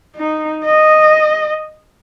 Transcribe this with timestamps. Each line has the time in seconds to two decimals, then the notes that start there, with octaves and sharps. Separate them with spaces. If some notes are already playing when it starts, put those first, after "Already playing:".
0.16 D#4
0.65 D#5